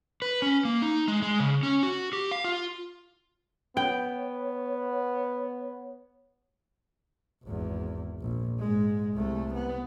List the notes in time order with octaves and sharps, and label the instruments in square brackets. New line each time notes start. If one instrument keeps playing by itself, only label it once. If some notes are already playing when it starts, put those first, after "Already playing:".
[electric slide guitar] B4
C#4
A#3
D#4
G#3
G#3
C#3
C#4
F#4
G4
F5
F4
[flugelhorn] B3 [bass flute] C#5 [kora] G5
[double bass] G#1 E2
A#1
G#2 G#3
C2 A3
B3